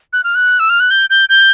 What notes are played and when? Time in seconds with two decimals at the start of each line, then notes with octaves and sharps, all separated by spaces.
0.13 F#6
0.24 F6
0.35 F#6
0.60 E6
0.70 F6
0.80 F#6
0.90 G6
1.10 G6
1.29 G6